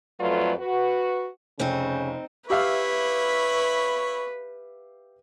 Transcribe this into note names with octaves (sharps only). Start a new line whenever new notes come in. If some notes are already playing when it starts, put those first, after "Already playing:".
F2 F#3 A3 F4 B4 D5
F#4 B4
F1 C#3 C4 D#4
E4 G4 B4 C#5 E5 F5 B5